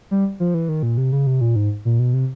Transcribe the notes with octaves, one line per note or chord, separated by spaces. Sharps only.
G3
F3
E3
D#3
A#2
C3
C#3
C3
A#2
G#2
A#2
B2
C3